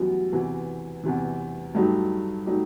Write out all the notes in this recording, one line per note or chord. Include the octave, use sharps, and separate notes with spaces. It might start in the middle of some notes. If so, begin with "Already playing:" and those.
Already playing: F#2 E3 G3 B3
E2 C3 E3
E2 C3 E3
G2 F#3 A3 D#4 G4
F#3 A3 D#4 G4